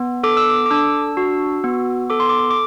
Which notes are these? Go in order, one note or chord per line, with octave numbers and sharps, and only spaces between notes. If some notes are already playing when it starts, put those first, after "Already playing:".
Already playing: B3
A4 D6
E6
D6
D6
D4 E6
F#4
B3
A4 D6
C6
D6
D6